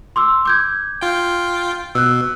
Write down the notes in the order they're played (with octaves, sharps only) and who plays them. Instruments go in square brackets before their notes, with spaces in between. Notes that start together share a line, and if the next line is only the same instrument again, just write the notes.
[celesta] C6 D6 E6
D6 G6 G#6
[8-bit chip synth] F4 G5
[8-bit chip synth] B2 [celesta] E6 F#6